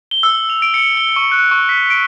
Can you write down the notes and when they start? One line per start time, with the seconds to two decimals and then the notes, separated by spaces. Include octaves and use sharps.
0.11 G7
0.23 E6
0.50 F7
0.62 D7
0.74 C#7
0.97 G7
1.16 C#6
1.32 F#6
1.51 C#6
1.69 B6
1.90 D7